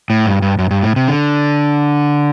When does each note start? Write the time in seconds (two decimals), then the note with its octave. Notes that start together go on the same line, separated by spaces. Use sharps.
0.10 A2
0.26 G2
0.42 G2
0.59 F#2
0.71 G2
0.83 A2
0.96 C3
1.08 D3